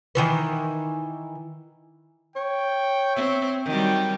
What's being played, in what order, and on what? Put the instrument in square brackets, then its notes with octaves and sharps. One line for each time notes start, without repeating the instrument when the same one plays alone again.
[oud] D#3 E3 B4
[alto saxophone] C#5 [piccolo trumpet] G5
[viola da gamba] C4 [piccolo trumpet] E5
[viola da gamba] D#3 F#3 G3 [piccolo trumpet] G5